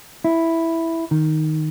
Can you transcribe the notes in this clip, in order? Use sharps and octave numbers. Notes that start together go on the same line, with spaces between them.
E4
D#3